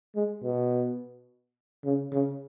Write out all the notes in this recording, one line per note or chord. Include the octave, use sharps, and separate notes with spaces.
G#3
B2
C#3
C#3